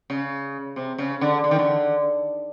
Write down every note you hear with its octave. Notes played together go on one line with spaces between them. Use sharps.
C#3
C3
C#3
D3
D3
D#3
D3